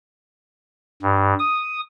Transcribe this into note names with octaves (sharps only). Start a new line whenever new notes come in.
G2
D#6